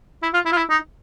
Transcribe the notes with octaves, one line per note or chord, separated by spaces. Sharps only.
E4
F4
E4
F4
E4
D#4